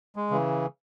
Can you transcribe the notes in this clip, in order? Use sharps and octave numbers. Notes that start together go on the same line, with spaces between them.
G#3
C#3 E3